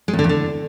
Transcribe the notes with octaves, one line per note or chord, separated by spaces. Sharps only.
G#3
E2
D3
E2
D3